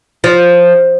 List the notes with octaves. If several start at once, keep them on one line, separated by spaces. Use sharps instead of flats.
F3